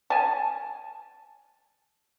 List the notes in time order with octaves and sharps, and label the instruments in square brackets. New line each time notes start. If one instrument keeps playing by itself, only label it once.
[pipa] G#5 A5